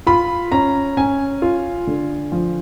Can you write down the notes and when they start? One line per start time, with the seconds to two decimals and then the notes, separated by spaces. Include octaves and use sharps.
0.07 F4 B5
0.52 C#4 A#5
0.97 C#4 G#5
1.42 F4
1.87 D3
2.32 F3